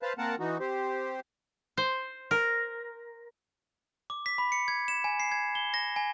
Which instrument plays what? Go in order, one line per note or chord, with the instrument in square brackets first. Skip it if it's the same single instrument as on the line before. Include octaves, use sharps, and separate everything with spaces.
[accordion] B4 C5 F5 A5
A#3 C4 A#4 F#5 A5
E3 D#4 F#4
C4 G4 C5
[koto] C5
A#4
[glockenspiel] D6
B6
B5
C#7
G#6
E7
G#5
C7
G#6
G7
A#6
G#5